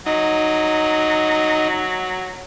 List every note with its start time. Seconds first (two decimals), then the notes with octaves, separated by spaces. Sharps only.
0.06 F#3 D#4